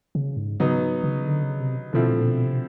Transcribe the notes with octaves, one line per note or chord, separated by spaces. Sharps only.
C#3
G#2
C#3 F#3 B3 D#4
C#3
D3
C#3
C3
B2 D3 F3 A3 C4 E4
A#2
B2
C3